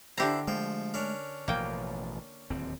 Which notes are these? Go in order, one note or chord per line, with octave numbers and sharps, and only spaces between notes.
D3 D4 E4 G4 C5 A#5
F3 G#3 A3 G5
C#4 D4 A#4
A1 B2 F3 A#3 G5
D1 D#2 C4